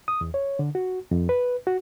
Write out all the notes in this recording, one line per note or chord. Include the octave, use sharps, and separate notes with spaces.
D#6
E2
C#5
D3
F#4
F2
B4
F#4